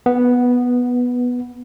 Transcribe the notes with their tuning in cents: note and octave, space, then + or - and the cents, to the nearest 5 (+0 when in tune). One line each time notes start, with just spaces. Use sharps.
B3 -5